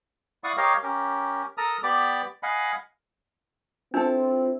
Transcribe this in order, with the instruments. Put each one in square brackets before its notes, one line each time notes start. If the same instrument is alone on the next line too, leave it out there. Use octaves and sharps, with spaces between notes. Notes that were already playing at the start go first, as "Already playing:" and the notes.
[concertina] E4 D5 F5 F#5 C#6 D#6
G4 A#4 C#5 D#5 F5
C#4 G4 A#4
A4 A#4 A5 A#5 D#6
B3 G4 D5 B5 D6
D#5 F5 F#5 G#5 B5
[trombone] C4 [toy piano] D4 [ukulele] E4 A4 [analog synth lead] F4